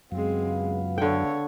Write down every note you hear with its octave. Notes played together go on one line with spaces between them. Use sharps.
C#2 F#2 F#3 G#3 B3 C4 F5
D3 A4 C#5 G5